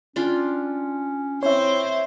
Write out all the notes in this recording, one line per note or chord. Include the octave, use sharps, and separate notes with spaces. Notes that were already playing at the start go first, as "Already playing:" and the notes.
C#4 D4 F4 G5
C4 E4 C5 C#5 E5